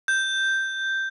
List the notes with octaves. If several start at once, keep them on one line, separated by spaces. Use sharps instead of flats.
G6